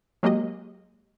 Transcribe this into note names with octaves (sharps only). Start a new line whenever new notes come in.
F#3 G#3 A#3 G4 D#5